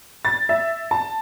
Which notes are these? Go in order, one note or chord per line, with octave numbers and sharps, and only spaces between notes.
A6
E5
A5